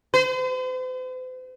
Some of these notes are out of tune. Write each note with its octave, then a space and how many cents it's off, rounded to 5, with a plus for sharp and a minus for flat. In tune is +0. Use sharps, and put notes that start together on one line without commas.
C5 -45